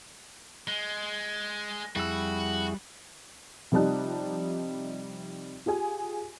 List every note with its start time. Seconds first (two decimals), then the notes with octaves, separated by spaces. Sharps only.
0.68 G#3
1.96 F2 G3 E4 F#4 G#4 E6
3.72 C3 F3 G3 D#4 A5 F#6
5.66 F4 G4 G#4 G#5